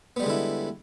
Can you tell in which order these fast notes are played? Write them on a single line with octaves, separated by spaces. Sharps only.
B3 G3 G#3 D3 E4